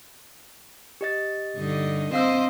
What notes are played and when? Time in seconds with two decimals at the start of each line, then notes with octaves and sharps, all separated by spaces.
1.01 G4 D#5 A6
1.56 G2 D3 D#4
2.13 C4 C5 D#5 F5 E6